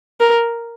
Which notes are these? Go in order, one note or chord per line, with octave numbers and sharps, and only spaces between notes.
A#4